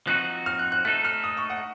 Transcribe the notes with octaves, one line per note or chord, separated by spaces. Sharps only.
F3 C4 D#4 F#4 F#6
F6
F#6
F#6
A3 D#4 A4 F#6
F6
D#6
C#6
F#5